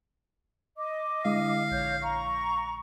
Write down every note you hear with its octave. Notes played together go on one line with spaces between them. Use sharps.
D#5 D6
D3 G#3 E4 F5
A#1 C#5 G6 A#6
A#5 C#6